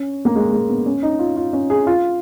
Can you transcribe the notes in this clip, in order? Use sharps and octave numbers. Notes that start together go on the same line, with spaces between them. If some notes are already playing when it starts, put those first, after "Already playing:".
Already playing: C#4
A#3
G#3
G#3
B3
C#4
D#4
F4
F4
C#4
G#4
F4